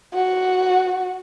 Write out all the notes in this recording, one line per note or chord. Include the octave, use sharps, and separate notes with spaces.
F#4